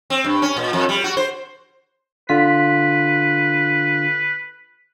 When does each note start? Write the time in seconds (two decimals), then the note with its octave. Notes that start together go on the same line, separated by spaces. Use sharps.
0.10 C4
0.24 G2
0.42 C#4
0.57 A#2
0.73 F2
0.89 G3
1.04 F#4
1.17 C5
2.29 D3 F4 B4 B6